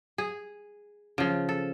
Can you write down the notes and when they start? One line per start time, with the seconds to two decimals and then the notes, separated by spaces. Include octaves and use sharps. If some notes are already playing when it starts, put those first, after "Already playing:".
0.18 G#4
1.18 C#3 F3
1.49 A4